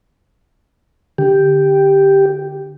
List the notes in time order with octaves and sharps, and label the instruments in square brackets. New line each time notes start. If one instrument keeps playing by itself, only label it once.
[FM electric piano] D3 [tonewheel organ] G4